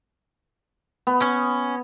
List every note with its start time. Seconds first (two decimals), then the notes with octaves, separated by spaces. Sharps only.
1.07 B3
1.22 C#4